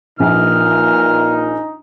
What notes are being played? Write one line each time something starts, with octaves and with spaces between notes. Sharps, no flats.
A#1 A#2 E3 D#4 F6